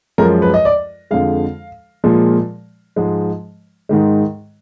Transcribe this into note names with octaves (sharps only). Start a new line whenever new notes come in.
F#2 F3 G#3 A#4
B4
D#5
D5
F2 D3 F3 G#3 F5
A#2 F3 G#3
G#2 F3 G#3
G#2 D#3 G#3